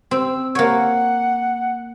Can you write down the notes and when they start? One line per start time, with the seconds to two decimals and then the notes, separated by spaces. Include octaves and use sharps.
0.11 C4 E6
0.55 A#3 C#5 F#5